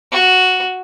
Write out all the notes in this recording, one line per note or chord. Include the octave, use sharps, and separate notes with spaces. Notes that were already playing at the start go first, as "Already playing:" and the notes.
F#4